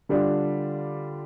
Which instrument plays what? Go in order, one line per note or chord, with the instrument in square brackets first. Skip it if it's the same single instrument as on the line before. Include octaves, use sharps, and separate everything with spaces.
[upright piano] D3 G3 D4 F4